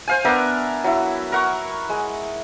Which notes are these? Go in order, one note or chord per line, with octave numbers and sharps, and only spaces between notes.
C5 F5 G#5
B3 D4 A#4 E5
F#3 E4
A#4 F#5 C#6
G#3